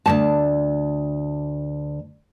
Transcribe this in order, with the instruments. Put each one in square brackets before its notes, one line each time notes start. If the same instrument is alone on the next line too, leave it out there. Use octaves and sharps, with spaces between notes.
[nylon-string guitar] D2 G#2 A5